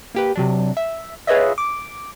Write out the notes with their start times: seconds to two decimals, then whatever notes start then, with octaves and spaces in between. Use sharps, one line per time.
0.15 A#3 G4 B4
0.36 C3 F#3 D4
0.77 E5
1.27 F4 G#4 B4 C#5 D#5 E5
1.58 D6